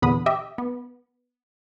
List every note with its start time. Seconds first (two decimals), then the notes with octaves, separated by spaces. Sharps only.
0.02 E2 A#2 D3 B3 B5 D#6
0.26 G4 D#5 E5
0.58 B3